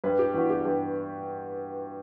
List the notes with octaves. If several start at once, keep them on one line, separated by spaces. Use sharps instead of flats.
G2 B4
G4
E3 B3 D4 F#4
G4
G2 G4